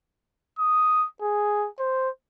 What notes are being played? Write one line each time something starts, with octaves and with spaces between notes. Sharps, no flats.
D#6
G#4
C5